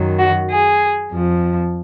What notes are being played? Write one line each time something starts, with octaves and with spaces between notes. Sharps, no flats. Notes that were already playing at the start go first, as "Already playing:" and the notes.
Already playing: F#2 D#3 F#3
F#4
G#4
F2 F3